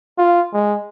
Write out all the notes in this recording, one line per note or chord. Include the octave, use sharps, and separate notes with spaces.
F4
G#3